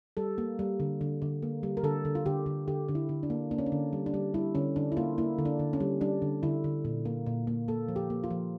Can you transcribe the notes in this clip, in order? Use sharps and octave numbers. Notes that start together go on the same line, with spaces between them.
G3 A4
A#3
G3
D3
D3
D3
A#3
G3
A#4
D3 A4
D3
F4
D3 G4
D3
D3 G4
D3
E4
D3
D4
A#3
A#3 D4
C#4
D4
D3
G3
D4
G3
G3 E4
D3 C#4
D3 D4
E4
A#3 F4
A#3 E4
D3
D4
D3
C#4
G3
G3 D4
D3
D3 E4
D3
A#2
A#3
A#2
A#3
A#3 A4
F3
G4
A#3
F4
F3